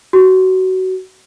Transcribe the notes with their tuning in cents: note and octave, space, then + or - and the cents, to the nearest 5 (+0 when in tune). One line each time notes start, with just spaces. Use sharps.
F#4 +20